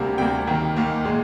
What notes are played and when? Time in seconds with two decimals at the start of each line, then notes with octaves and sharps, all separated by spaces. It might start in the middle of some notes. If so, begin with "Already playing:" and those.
Already playing: D2 C3 G3 A#3
0.18 D2 C3 G3 A#3 G5
0.47 D#2 D#3 A#3
0.76 D#2 D#3 A#3
1.05 A#2 G#3